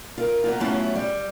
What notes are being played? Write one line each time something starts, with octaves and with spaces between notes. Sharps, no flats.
F4 A#4
B3 D#4 F4
F#3 A3 B3 C#4 E4 F4
G3